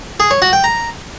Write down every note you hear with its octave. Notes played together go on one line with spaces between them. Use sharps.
G#4
C#5
F#4
G5
A#5